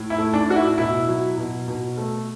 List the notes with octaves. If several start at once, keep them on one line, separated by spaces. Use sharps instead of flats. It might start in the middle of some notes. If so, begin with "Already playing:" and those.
Already playing: A2
E4
A3
D4
A2 F#4
E4
B2 E4
F#3
B2
B2
A3